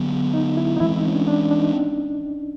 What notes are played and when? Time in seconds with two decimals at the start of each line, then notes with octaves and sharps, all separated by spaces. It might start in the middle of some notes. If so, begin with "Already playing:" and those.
Already playing: D3 F#3 B3
0.34 D#4
0.57 E4
0.76 D#4
0.80 E3 G#3 C4 E4
0.96 D#4
1.08 C#4
1.12 D4
1.28 D4
1.51 D4
1.58 D#4